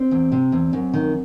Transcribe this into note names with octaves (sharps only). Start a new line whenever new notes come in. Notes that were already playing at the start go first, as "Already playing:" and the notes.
Already playing: C4
E2
C3
E2
F#2
D#3